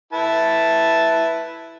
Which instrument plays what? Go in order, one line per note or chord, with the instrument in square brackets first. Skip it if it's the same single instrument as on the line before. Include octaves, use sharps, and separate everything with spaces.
[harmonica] E4 B4 A5